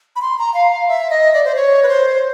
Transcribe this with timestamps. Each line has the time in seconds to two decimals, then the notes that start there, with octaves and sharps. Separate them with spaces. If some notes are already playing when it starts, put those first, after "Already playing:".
0.16 B5
0.22 C6
0.39 A#5
0.54 F5
0.72 F5
0.88 E5
1.10 D#5
1.34 D5
1.44 C5
1.56 C#5
1.83 B4
1.88 C5